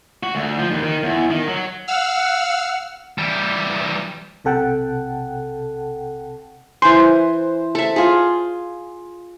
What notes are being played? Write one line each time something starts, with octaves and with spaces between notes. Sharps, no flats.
F#4
D2
F3
D#2
D#3
E2
D#3
F#3
F5 F#5 E6 F6
E3 G3
B1 C3 A4 F#5 G5 A5
E3 C5 G#5
A4 E5
F4 G#4